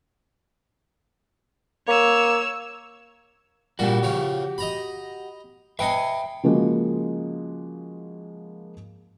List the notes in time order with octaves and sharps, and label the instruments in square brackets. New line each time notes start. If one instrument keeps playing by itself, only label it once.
[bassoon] A#3 [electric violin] C#5 E6
[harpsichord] A#2 G3 D4 [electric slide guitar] F#4 G4
[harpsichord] C#3 F3 C#5
D#5 A#5 B5
[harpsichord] B4 D#5 G#5 [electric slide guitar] E5 G5
[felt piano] C#3 F3 G#3 A#3 F#4